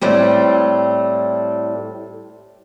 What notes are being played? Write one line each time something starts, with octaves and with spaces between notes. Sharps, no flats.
A2 G3 C4